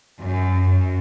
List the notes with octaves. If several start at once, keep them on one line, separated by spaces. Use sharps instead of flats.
F#2
F#2